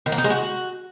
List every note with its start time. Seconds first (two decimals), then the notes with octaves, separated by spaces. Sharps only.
0.06 D#3
0.12 A#3
0.18 D#4
0.24 G#3
0.30 F#4